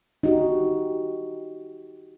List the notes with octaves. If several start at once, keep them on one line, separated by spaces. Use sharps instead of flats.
D#4 F#4 G4